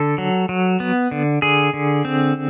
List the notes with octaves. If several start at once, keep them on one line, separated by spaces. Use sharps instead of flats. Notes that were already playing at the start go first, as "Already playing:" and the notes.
Already playing: D3 A4
F#3
F#3
B3
D3
D3 G#4
D3
C4